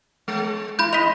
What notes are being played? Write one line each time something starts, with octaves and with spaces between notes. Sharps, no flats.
G#3
E4 B5 G6
G#2 D#5 B6 F7